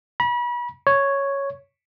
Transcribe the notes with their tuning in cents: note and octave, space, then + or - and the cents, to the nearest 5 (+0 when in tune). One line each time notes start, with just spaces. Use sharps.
B5 -35
C#5 +0